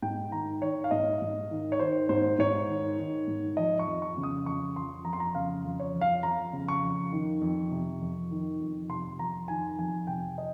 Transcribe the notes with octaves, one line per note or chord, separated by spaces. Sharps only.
G#2 G5
D#3 A#5
D#3 C#5
F5
G#2 D#5
G#2
D#3
C#5
D#3 C5
G#2 C5
G#2 C#5
D#3
D#3
G#2
F3 D#5
C#6
F2
C#6
C#3
D#6
F2 C#6
F3 C6
F2 A#5
C6
A#5
C#3 F5
F2
C#5
F3
F5
F2 A#5
C#3
C#6
F2
D#3
F2
C3
F2
D#3
F2
C3 C6
F2 A#5
D#3 G#5
F2 G#5
C3 G5
D#5